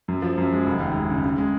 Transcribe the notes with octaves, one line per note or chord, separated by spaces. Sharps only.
F#2
F3
F#2
G#3
F1
D#2
G#3
C#3
C#3
G#3